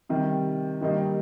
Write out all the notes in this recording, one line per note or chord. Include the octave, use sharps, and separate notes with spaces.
C3 D#3 G3
G2 D#3 G3 A#3 D#4